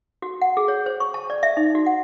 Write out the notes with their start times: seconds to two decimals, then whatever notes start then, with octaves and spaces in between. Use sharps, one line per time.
0.22 F#4
0.41 F#5
0.57 G#4
0.68 C#5
0.86 C5
1.00 C#6
1.14 A5
1.30 D5
1.43 E5
1.57 D#4
1.75 F#4
1.86 F#5